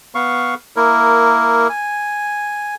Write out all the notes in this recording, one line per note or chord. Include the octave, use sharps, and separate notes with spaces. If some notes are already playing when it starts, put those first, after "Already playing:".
B3 F5 C#6
A#3 E4 A#4
G#5